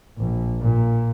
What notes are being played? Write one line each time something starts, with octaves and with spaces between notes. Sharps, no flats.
A#1
A#2